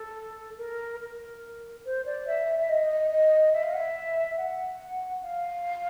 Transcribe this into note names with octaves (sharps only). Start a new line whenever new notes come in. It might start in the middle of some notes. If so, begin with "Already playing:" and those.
Already playing: A4
A#4
A#4
C5
D5
E5
E5
D#5
D#5
E5
F5
F#5
E5
F#5
F5